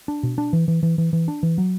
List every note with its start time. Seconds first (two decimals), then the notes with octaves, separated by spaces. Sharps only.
0.08 D4
0.23 B2
0.38 D4
0.53 E3
0.68 E3
0.83 E3
0.98 E3
1.13 E3
1.28 D4
1.43 E3
1.58 F#3